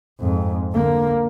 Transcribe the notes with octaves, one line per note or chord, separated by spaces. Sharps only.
F2 G#2
D3 A#3